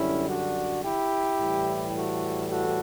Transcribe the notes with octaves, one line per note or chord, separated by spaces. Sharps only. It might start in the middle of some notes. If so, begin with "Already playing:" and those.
Already playing: F#2 D3 G3 C#4 E4
D4 F#4
E4 G4
A2 E3 G3
F#4 A4
F#4 A4